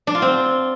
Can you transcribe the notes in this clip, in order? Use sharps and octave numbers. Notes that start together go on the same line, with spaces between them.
D4
F4
C4